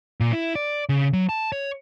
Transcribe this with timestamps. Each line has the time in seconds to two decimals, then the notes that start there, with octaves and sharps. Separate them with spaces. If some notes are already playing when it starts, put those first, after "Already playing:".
0.20 A#2
0.33 E4
0.55 D5
0.89 C#3
1.13 F#3
1.29 A5
1.52 C#5